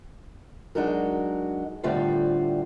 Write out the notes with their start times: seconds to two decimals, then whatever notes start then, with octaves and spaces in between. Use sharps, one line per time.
0.75 F#3 G#3 D4 D#4 F#4 A#4
1.83 A2 D3 G3 C4 F4 F5